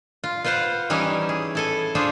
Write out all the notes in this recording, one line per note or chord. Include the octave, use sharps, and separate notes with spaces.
F4
F4 B4 C5 F5 F#5
E3 G3 C#4 D#4 E4
G#4
E4 A4 G#5
D4 F4 G#4 C5 C#5 E5